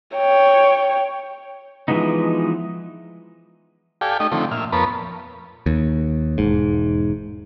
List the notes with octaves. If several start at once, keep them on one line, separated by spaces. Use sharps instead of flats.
C#5 G5
E3 F3 G#3 B3 D#4
G4 A4 D5 F5 G5 G#5
A3 D#4 G4 D#5
D3 D#3 F3 A3 C4
A#2 E5 F6
F2 B3 A#4 C#5 A5 B5
D#2
E1 G#2